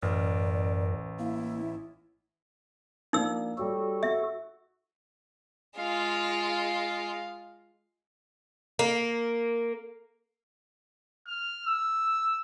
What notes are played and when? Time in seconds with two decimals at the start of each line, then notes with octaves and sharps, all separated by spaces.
0.03 A1 F#2 A#4 D5
1.19 A#3 E4
3.13 F3 A#3 D4 D#4 E6
3.58 G3 F#4 G4 A4 C#5
4.03 E5 F#5
5.78 G#3 F4 F5
8.79 A#3
11.27 F6
11.66 E6